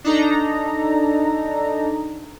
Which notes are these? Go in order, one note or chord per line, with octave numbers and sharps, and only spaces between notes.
D4 D#4 A4 A#5